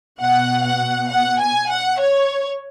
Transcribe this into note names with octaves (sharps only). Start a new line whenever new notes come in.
B2 F#5
F#5
F#5
G#5
F#5
C#5